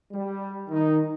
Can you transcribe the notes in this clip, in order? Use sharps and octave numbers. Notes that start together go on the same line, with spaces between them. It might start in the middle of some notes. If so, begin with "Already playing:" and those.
G3
D#3 D#4